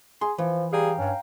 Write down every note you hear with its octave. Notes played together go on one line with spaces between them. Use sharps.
G#4 C6
E3 F3
G3 G#4 F5 G5 A#5
G2 C#4